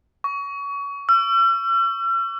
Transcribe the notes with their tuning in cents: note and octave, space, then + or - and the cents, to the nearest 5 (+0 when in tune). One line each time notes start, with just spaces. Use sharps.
C#6 +30
E6 +45